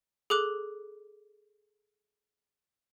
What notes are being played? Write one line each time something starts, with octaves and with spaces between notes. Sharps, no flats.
G#4 A4 D6 F#6